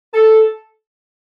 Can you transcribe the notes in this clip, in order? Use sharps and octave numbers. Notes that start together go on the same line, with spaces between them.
A4